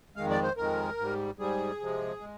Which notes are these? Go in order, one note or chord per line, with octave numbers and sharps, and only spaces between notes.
F2 D#3 G#3 F5
D5
C5
F2 D#3 G#3 A#4
G#2 G3
G#2 G3 G#4
C3 F3 G#3
G#3